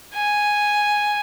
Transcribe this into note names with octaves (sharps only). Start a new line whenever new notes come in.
G#5